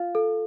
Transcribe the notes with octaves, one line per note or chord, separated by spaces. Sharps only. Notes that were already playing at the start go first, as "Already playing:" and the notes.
Already playing: F4
A4